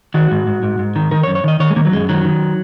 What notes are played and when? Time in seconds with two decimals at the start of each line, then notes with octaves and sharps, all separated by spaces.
0.14 D#3 F#4
0.31 G#2
0.47 G#2
0.63 G#2
0.79 G#2
0.96 D#3
1.11 D#3 A#4
1.23 C#5
1.27 F#2
1.35 C#5
1.44 D#3 D#5
1.60 D#3 C#5
1.70 G#3
1.76 D#3 A#3
1.85 F#3
1.92 F#2 G#3
2.09 D#3 F#3
2.25 D#3